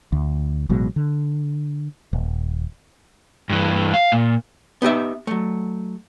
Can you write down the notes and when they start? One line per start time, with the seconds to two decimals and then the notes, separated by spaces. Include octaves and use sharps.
0.12 D2
0.69 A1 B2 F#3 G#3
0.96 D3
2.13 D#1
3.50 G2 E3
3.94 F5
4.12 A#2
4.82 B3 D#4 G4 E5
5.27 F#3 A3